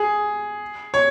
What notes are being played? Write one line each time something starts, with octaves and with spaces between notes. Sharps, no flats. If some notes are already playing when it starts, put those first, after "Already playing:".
Already playing: G#4
C#5